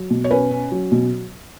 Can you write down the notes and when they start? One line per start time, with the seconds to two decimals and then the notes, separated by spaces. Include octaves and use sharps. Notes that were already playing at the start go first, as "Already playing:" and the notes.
Already playing: F#3
0.11 B2
0.24 C#5
0.30 C#4 B4
0.51 C#4
0.72 F#3
0.92 B2